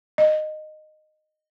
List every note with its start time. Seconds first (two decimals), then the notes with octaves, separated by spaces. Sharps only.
0.18 D#5